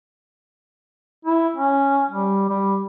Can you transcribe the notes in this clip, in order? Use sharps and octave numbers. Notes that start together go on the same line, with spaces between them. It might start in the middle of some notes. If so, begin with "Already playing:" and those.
E4
C#4
G3
G3